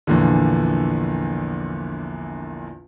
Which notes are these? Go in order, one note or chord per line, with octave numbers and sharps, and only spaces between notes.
A#1 E2 A#2 D3